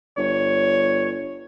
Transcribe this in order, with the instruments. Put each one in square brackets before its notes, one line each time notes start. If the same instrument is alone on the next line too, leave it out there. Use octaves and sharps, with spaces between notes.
[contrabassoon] G1 [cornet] C#5